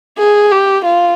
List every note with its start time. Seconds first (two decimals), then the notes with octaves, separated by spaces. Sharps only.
0.18 G#4
0.52 G4
0.85 F4